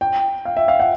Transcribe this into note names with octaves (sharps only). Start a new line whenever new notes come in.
G5
F5
E5
F5
F#5